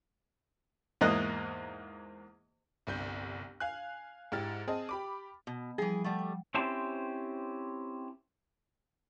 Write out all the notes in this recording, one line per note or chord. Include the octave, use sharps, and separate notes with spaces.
E2 G#2 A#3 D#5 F#6
G1 C2 G6
F5 G#5 F#6
G#2 E4 G4 F6 A6
C4 G#4 D#5 A5
G4 B5 D6
B2
E3 F3 G3 G#4
G3 A3 F#5 G5
G5
C4 C#4 E4 G4 C5 A5